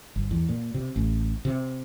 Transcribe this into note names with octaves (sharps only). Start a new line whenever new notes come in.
G1
E2
A#2
C3
A1
C3